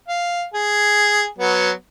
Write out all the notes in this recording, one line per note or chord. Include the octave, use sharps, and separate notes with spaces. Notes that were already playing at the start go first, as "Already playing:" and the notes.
F5
G#4
F#3 B3